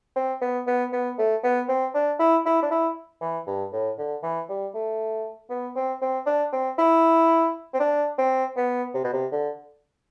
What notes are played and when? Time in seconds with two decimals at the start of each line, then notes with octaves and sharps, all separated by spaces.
0.16 C4
0.42 B3
0.67 B3
0.93 B3
1.18 A3
1.43 B3
1.69 C4
1.94 D4
2.19 E4
2.46 E4
2.62 D4
2.71 E4
3.21 E3
3.47 G2
3.73 A2
3.98 D3
4.23 E3
4.49 G3
4.75 A3
5.50 B3
5.76 C4
6.01 C4
6.26 D4
6.53 C4
6.78 E4
7.73 C4
7.80 D4
8.18 C4
8.57 B3
8.94 C3
9.04 B2
9.13 C3
9.32 D3